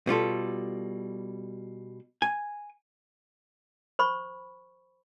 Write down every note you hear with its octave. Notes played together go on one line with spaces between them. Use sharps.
B2 G3 F4 A4
G#5
C5 B5 C#6